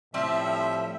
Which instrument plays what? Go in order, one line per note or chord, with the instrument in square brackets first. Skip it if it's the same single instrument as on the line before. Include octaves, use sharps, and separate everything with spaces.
[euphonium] A2 [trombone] F3 [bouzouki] G3 C4 A5 [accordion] E5